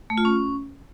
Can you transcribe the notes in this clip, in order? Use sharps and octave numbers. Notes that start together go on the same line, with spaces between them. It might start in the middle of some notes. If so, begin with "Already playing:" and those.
A3
F4
C#4